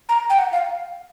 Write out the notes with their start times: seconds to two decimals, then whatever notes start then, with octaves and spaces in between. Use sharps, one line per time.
0.09 A#5
0.30 G5
0.38 F#5
0.52 F5